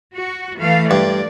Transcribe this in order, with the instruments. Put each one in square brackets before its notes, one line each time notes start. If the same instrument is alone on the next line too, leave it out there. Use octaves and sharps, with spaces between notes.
[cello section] F#4
E3 A3 F5
[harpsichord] G2 [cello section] D5